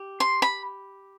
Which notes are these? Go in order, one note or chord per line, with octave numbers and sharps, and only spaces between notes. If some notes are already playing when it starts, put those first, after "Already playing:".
Already playing: G4
C6
B5